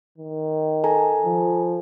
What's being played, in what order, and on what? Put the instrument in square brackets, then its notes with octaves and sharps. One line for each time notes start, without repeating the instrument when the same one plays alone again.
[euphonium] D#3
[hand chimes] A4 G#5 A#5
[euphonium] F3